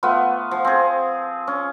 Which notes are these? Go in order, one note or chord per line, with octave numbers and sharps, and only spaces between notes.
A3 B3 F4
F3
C4 G#4
C#4